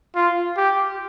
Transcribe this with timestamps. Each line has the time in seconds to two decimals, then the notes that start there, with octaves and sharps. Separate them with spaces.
0.15 F4
0.57 G4